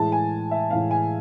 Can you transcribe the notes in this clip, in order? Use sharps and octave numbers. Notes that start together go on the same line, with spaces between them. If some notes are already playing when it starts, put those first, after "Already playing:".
Already playing: A2 E3 G#3 A5
G#5
E5
A2 E3 G#3 F5
G#5